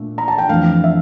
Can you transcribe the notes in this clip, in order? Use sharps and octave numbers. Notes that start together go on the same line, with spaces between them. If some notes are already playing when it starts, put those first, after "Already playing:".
Already playing: A#2 A3 D4
A#5
A5
G5
F2 E3 A3 D4 F5
E5